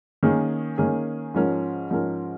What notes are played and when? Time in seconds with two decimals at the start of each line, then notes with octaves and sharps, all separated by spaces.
0.23 D#3 A#3 C#4 G#4
0.78 D#3 A#3 C#4 G#4
1.34 G#2 F3 C#4 A#4
1.90 G#2 F3 C#4 A#4